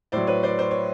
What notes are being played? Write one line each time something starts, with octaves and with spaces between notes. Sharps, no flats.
A2 F#3 C5 D5
B4 C#5
C5 D5
C5 D5
C#5